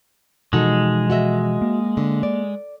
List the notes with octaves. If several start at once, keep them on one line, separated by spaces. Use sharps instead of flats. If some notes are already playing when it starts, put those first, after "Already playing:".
B2 E3 F3 G#3 D#4 F#4 A4
F#4 D#5 E5
A#3
D3
D5